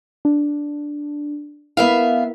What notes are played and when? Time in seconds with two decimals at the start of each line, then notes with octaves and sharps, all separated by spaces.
0.25 D4
1.77 B3 E4 A#4 B4 E5 F5